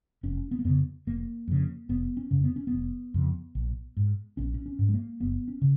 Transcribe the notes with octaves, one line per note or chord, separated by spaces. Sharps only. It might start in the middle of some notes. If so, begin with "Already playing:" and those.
F1 C#4
B3
A#3
F2 C#3 B3
F1 A#3
F2 C#3
F1 B3
C#4
F2 C#3
B3
C#4
B3
F1
F2 C#3
A#1
G#2
A#1 C#4
C#4
C#4
G#2
G#3
A#3
F#1 B3
C#4
C#3